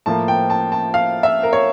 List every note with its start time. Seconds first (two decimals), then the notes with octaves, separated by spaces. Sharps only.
0.06 A2 F3 A#3 A5
0.28 G5
0.50 A5
0.72 A5
0.94 F5
1.23 E5
1.43 A#4
1.53 C#5